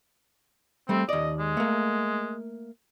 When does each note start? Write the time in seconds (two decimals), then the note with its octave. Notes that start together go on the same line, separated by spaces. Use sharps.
0.89 G3 A3 C4
1.09 D#2 D5 D#5
1.40 G#3
1.57 A3 A#3